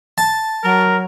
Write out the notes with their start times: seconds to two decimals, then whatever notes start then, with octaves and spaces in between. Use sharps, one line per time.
0.18 A5
0.64 F#3 A#4